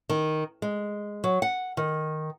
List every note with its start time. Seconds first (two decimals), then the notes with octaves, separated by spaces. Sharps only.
0.09 D#3
0.62 G#3
1.24 F#3
1.42 F#5
1.77 D#3